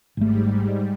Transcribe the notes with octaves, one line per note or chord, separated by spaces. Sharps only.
G#1 G#2 G3 A3